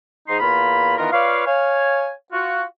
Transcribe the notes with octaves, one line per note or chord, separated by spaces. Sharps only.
G#2 D#4 C6
E2 A#3 F4 B5
D#3 E3 B3 F4 A#4
F4 B4 C#5 D5 F5
C#5 F5 G#5
F4 F#4